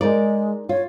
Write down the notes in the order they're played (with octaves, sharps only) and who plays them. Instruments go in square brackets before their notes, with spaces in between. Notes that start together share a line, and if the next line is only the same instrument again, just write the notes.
[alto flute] G#3 [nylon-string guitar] D#4 A#4 D5
[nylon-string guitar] F4 [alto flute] C#5